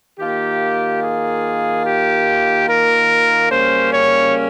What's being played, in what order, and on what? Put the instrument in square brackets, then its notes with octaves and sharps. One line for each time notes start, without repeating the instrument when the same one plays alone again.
[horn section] D#3 A#3 F4 G4
G#4
G4
A#4
C#3 G3 A#3 C#4 C5
C#5